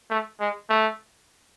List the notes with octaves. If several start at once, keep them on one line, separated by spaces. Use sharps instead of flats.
A3
G#3
A3